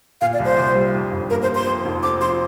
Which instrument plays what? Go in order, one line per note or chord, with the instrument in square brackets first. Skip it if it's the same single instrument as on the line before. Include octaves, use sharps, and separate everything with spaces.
[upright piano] A#2 [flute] F5
[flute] D5
[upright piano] C2
[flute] C5
[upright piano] C2
G3
F2
G1
[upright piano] A#3 [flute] A#4
[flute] C5
[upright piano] F3
[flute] C6
[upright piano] F2
F1
[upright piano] C4 [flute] D6
[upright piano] F3 [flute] C6